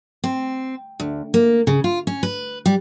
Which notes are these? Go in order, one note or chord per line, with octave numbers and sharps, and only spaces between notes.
C4
D2
A#3
C#3
F4
C#4
B4
G3